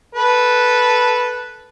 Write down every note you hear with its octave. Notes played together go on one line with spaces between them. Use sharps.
A4 B4